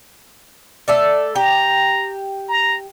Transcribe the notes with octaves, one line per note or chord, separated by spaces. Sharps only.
A3 A4 D5
G4 A#5
A#5